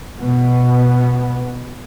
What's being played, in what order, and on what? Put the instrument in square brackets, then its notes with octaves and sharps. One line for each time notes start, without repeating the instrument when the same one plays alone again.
[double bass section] B2 B3